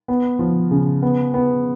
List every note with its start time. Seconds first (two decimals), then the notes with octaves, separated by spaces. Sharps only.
0.08 B3
0.39 F3
0.71 C#3
1.02 B3
1.34 B3